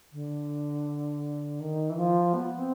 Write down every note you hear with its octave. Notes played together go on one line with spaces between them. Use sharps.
D3
D#3
E3
F3
B3
C4